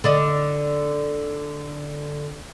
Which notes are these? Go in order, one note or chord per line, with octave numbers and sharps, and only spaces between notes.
D3 D5 D#5